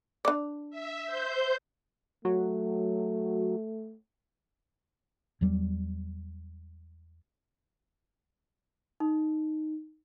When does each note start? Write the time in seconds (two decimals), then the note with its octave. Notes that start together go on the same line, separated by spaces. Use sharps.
0.25 D4 D5
0.70 E5
1.05 C5 G6
2.25 F#3 A3
5.41 E2 F#3 G3
9.00 D#4